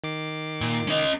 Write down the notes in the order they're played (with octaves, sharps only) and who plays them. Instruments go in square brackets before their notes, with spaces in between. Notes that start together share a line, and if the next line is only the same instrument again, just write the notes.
[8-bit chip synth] D#3 D6 C7
[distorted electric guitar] A#2
C#4 D#5